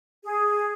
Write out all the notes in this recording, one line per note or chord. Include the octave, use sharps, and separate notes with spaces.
G#4